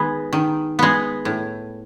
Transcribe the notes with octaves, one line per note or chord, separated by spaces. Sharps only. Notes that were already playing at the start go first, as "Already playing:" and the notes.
Already playing: D#3 G#3 B3
D#3
G#3 B3
A2